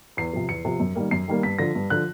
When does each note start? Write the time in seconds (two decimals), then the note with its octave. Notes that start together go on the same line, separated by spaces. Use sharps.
0.17 E2 C7
0.33 C3 F3
0.49 E2 C#7
0.65 C3 F3
0.80 F#2
0.95 D#3 G3 A#3
1.11 F#2 C7
1.28 D#3 G3 A#3
1.43 G2 B6
1.59 D3 F3 A#6
1.75 G2
1.90 D3 F3 F#6